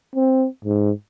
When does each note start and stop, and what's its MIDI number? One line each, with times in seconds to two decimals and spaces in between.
0.16 0.46 60
0.65 0.91 44